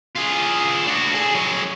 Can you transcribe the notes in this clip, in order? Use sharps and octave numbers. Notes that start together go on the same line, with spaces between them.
F4 G#4
D4 F#4
G#4 A4
F#3 G#4